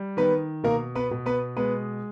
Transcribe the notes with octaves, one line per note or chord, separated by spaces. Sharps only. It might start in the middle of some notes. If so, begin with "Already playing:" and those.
Already playing: G3
D#3 B3 B4
B2 A#3 A#4
B3 B4
B2
B3 B4
G#3 B3 B4